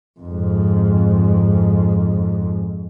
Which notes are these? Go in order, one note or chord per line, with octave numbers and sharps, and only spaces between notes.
F2 G#2